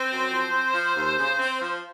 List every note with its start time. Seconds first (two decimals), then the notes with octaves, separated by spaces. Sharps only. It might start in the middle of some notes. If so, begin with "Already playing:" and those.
Already playing: C4 C5
0.10 F#2
0.31 F3
0.53 C4
0.74 F3
0.96 D#2
1.18 C#3
1.39 C4
1.61 F3